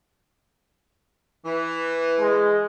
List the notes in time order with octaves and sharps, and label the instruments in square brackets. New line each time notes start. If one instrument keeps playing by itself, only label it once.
[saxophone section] E3
[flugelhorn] G#3